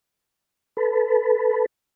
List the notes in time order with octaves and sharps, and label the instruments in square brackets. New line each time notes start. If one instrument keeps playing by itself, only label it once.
[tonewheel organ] A4 B4